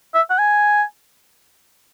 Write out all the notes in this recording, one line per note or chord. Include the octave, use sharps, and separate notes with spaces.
E5
F#5
G#5